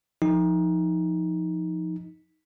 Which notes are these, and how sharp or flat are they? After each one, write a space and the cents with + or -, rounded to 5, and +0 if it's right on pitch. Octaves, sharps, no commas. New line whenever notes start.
F3 +0 D#4 +10